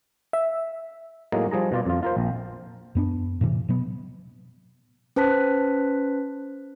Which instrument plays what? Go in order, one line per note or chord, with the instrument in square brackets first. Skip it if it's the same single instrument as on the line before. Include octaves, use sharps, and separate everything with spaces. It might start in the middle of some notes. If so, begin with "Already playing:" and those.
[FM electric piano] E5
[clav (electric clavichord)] A2 F#3 G#3 A#3 D#4
F3 G3 G#4 A#5
B2 F4 D5
F2 F4
F4 A#4 C5
A#1
[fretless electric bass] F#2 B3 D4
A2 C3 E3
B2 F#3 B3
[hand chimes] C#4 B4 C5 A5 F#6 B6